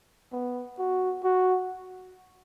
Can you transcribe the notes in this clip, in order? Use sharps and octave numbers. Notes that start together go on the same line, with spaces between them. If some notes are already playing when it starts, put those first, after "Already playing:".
B3
F#4
F#4